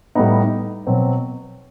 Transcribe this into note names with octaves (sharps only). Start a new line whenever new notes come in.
A2 G3 B3 D#4
B2 F#3 C4